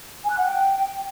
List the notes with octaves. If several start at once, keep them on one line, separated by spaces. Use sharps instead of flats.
G#5
F#6
F#5
G5